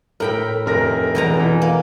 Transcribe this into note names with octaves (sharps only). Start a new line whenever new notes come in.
A2 A#4 G5 B5
F1 A#4 A#6
E2 B2 A#5
E3
A#3